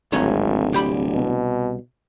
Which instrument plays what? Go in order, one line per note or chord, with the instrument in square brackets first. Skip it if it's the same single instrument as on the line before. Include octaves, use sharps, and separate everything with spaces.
[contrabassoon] D1 [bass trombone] G#1 [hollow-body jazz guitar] G#3 D#4 C#5
[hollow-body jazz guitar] C2 G4 B5
[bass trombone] B2